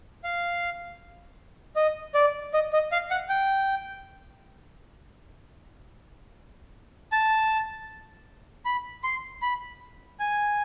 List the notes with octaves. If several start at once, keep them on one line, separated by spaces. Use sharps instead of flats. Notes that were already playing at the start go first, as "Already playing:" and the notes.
F5
D#5
D5
D#5
D#5
F5
F#5
G5
A5
B5
C6
B5
G#5